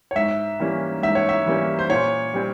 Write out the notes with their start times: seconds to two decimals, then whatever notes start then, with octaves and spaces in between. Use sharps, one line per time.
0.11 C#5
0.16 G#2 E5
0.60 E3 G3 A#3 C#4
1.02 G#2 E5
1.15 C#5
1.29 E5
1.46 E3 G3 A#3 C#4
1.79 C5
1.90 A#2 C#5
2.33 G3 C4